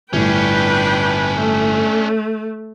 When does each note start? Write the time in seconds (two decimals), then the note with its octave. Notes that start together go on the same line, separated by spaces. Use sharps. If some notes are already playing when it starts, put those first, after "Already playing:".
0.13 G1 A2 C#4 D4 B4 G5
1.39 A3